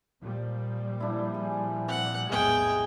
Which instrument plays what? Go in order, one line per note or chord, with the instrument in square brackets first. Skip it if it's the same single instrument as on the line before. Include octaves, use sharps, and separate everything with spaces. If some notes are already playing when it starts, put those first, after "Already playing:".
[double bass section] A#2 F3 G3
[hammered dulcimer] D4 E4
G#4
[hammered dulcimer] C3 [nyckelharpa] F#5
[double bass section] B1 E2 A2 [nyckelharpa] G#3 G5 [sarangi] G#4